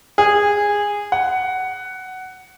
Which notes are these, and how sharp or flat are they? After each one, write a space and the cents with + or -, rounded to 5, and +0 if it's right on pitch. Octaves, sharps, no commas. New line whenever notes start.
G#4 -15
F#5 +10